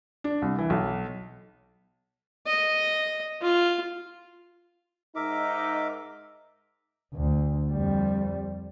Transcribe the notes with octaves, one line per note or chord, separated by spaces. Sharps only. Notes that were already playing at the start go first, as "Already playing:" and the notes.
D4
C2
E3
B1
D#5
F4
G#2 D#4 A#4 E5 D6
D2
F2 G3